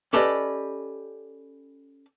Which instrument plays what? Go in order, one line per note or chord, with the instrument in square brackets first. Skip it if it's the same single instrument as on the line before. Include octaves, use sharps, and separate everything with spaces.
[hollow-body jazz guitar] C#4 G4 A4 B4 D5 D#5